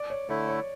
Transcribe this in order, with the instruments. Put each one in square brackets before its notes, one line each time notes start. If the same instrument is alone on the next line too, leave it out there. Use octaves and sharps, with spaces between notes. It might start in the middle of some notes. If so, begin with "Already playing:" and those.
Already playing: [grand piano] D5
C#5
[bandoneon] D3 A3 E4 [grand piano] C#5
[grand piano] C#5